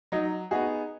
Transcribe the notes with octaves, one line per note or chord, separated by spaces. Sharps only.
F#3 D#4
B3 D#4 F#4 G#4